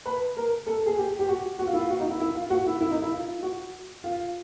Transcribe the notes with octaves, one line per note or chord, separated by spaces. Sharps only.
B4
A#4
A4
G#4
G4
G4
F#4
F#4
F4
E4
F4
F#4
D#4
E4
E4
F4
F#4
E4
E4
D#4
E4
F4
F#4
F4